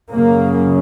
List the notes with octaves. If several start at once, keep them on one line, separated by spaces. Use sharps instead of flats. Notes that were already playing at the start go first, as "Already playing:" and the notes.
F#2 C#3 A#3